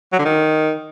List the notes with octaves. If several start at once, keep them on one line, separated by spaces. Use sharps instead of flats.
F#3
D3
D#3